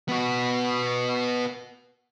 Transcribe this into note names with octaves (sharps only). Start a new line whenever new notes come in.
B3 F#4